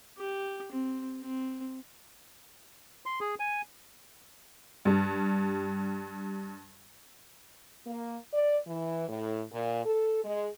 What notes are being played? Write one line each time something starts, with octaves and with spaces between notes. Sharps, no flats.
G4
C4
C4
C6
G#4
G#5
G2 G3
A#3
D5
E3
A2
A#2
A4
G#3